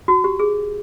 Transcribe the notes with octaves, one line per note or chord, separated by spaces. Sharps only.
F#4
G4
G#4